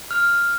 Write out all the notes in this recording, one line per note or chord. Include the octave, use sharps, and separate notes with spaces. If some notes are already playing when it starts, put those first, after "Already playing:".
F6